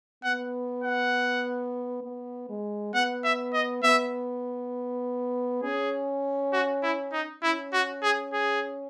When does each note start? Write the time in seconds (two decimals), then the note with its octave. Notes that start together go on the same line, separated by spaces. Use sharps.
0.24 B3 F#5
0.84 F#5
2.03 B3
2.49 G#3
2.94 B3 F#5
3.24 E5
3.53 D#5
3.83 B3 E5
5.63 C#4 G#4
6.53 F#4
6.83 E4
7.13 D#4
7.43 C#4 E4
7.73 F#4
8.02 G#4
8.33 G#4